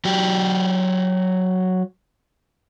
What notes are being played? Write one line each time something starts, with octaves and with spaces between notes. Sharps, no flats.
F#3 G4